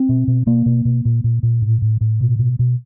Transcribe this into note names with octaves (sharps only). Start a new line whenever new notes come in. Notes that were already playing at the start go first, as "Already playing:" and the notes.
Already playing: C4
B2
B2
B2 A#3
B2
B2
A#2
A#2
A#2
A2
A2
A2
B2
B2
B2